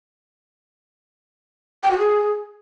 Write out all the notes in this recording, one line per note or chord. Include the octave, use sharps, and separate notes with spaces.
G5
F#4
G#4